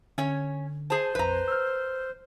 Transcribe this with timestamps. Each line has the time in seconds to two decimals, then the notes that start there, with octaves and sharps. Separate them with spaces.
0.18 D3 C#4 C#5
0.90 G#4 C5 A5
1.15 A#1 F2 B4 A#5
1.48 E6 F6